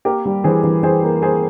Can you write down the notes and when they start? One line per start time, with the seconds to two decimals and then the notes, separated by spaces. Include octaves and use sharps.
0.05 A#3 G4 A#4
0.26 G3
0.44 E3 G#4 C5
0.64 E3
0.83 E3 G#4 C5
1.03 A#3
1.22 A#3 G#4 C5